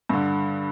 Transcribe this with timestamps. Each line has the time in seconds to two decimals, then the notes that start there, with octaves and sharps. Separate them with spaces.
0.09 G2 D3